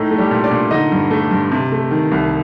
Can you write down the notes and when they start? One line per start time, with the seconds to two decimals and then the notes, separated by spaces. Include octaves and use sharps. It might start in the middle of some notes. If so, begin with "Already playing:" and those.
Already playing: A2 A3 D#4
0.11 A3
0.18 G3 G4
0.31 A#2
0.44 D4 D5
0.51 A#2
0.71 D3 D#4 D#5
0.92 G2
1.11 A3
1.31 G2
1.52 C3
1.72 A3
1.91 D#3
2.12 C2